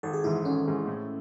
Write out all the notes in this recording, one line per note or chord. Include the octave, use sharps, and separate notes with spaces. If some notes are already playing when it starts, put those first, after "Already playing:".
G#1 A4
G#4
G#2 E3 E4
G#1 C#4
G#2 E3
A2